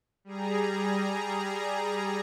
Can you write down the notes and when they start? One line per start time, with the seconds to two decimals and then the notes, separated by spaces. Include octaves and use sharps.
0.24 G3 G#4 A#5